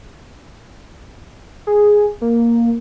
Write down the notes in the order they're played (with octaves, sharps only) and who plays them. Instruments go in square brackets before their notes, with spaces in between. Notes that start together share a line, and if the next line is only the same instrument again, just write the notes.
[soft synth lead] G#4
A#3